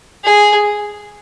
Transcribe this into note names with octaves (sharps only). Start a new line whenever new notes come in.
G#4